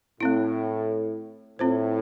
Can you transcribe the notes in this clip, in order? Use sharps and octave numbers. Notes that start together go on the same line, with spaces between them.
A2 A3 C4 E4
A2 C4 F4 C5